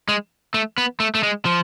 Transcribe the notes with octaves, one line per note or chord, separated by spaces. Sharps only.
G#3
A3
B3
A3
A3
G#3
F3